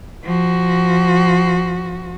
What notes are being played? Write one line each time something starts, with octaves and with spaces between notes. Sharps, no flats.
F3 F#4